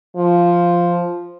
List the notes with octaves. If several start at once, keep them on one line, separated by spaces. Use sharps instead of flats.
F3